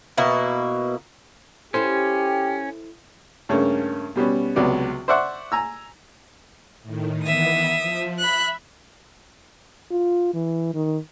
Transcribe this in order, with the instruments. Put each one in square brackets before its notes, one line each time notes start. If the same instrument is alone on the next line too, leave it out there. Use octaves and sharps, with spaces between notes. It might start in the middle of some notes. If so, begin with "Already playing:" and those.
[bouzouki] B2 A#3 E4
[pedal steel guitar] C#4 [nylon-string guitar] E4 A4 C5 [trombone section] G4
[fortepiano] G2 C#3 A3 A#3 C#4
B2 G3 B3 C#4
C#2 C3 F#3 B3 D5
C5 D5 E5 F#5 C#6
G#5 A#5 E6
[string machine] A2 D#3
[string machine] D#3 E3 B3 [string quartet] E5 D#6
[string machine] F3
[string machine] E5 [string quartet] B5 F#6
[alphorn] F4
E3
D#3